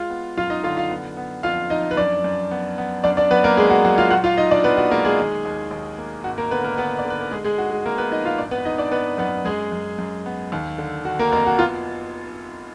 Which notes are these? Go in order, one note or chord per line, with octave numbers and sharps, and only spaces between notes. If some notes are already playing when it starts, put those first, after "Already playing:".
Already playing: G#3 F4 F5
B3
F#2 F4 F5
D#4 D#5
D3 F4 F5
F4 F5
B3
B3
F2 F4 F5
F2 D#4 D#5
B4
F#2 D4 D5
F#2
B3
B3
F#2 D4 D5
D4 D5
F#3 B3 B4
A#3 A#4
F#1 G#3 G#4
F#4
F#3 F#4
F4 F5
A#2 F#4 F#5
F4 F5
B1 D#4 D#5
D4 D5
B1 B3 B4
F#4
G#3 A#3 A#4
G#3 G#4
D#3
D#2
D#2
A#3
G#1 F#4
A#3 A#4
D3 B3 B4
A#3 A#4
D3 B3 B4
D5
D3
B4
A#4
G#3 G#4
G#3 G#4
G#2 F#4
G#3 G#4
G#1 A#3 A#4
B3 B4
F3 D#4 D#5
F4 F5
G#1 D4 D5
B3 B4
G#1 D#4 D#5
D4 D5
G#1 B3 B4
F#2 B3 B4
F#2 G#3 G#4
F#2
F#2
B3
D#2
D3
D3 F#4
A#3 A#4
F1 A#3 A#4
F#4
B3 F4